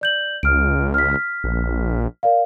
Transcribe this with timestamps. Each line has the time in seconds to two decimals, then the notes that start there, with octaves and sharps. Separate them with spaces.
0.01 D5 G6 F#7
0.43 C#2 F6 D7
0.94 F6 B6
1.44 A#1
2.23 A#4 D5 F5